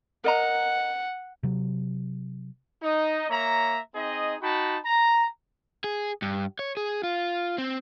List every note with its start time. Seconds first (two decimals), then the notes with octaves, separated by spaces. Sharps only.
0.24 A#4 D#5 F#5 A#5
1.43 C3 F#3
2.83 D#4 D#5
3.30 A#3 C#5 E5 A#5
3.95 C4 D#4 G#4 D#5
4.42 D#4 F#4 G5 A5 B5
4.85 A#5
5.84 G#4
6.22 G2
6.59 C#5
6.77 G#4
7.03 F4
7.58 C4